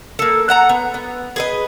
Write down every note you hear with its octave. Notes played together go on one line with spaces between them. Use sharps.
A#3 A4
A4 F#5 A#5
B3
B3
G#4 B4 D#5